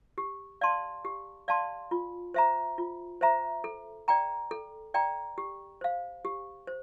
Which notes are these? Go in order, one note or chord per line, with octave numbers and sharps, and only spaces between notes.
G4
D5 F5 A5 C6
G4
D5 F5 A5 C6
F4
C5 E5 A#5
F4
C5 E5 A#5
A4
D5 G5 A#5
A4
D5 G5 A#5
G4
C5 F5
G4
C5